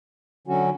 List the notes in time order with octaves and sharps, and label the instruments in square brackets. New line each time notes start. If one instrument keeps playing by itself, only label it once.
[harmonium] D3 F#3 C#4 F#4